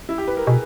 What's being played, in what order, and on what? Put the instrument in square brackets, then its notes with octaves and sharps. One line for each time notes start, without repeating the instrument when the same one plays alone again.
[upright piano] E4
G4
B4
A#4
[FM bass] B2 [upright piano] G#4